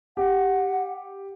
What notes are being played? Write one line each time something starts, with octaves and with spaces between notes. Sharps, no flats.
G4 F#5